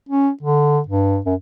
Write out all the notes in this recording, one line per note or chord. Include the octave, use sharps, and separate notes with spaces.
C#4
D3
G2
F#2